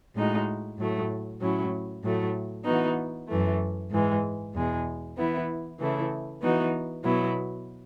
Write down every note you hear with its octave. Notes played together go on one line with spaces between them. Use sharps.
A2 G#3 D#4 F#4
A2 F#3 A3
A2 F#3 C#4 E4
A2 F#3 A3
E3 B3 D#4 F#4
F#2 E3 A3
G#2 E3 G#3
E2 B2 G#3
E3 B3 E4
C#3 E3 A3 E4
E3 B3 D#4 F#4
B2 F#3 B3 E4